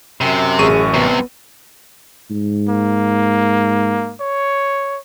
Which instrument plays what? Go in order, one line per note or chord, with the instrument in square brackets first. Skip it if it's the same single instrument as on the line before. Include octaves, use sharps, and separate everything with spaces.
[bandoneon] F#2 [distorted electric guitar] C3
[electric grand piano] A1 C#6 D#7 [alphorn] G#4
[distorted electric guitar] C2 C3 [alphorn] B3
[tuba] G#2
[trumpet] A#3
C#5